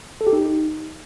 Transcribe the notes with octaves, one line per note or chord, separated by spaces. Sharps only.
A4
G4
D#4